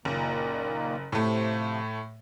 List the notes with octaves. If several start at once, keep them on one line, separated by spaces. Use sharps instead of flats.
F#1 A#2 D#3 A#3
A2 C3 F3 A3